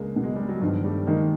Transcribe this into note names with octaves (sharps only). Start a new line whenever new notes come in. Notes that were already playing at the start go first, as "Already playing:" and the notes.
Already playing: C#2 G#3 A#3 D4
B2
G#3
G3
F#3
G2 D#3 F3
G3 A3
D#3 G#3 A#3